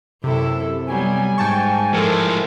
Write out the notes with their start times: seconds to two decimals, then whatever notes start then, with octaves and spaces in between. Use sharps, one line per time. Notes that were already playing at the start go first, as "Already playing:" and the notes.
0.24 F#2 C3 E4 A4
0.88 F#3 G3 B3 G#5
1.38 G#2 G5 A5 C#6
1.94 A2 F3 G#3 A4 A#4